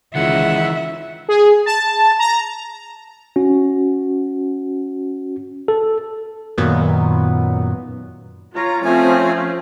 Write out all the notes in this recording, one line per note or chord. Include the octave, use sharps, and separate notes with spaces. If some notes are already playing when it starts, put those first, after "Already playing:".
C#2 D#3 E3 E5 F#5
G#4
A5
A#5
C#4 F#4
A4
F#2 A#2 D#3 F#3 B3
F4 C#5 A#5
F3 A3 C4 C#4 G#5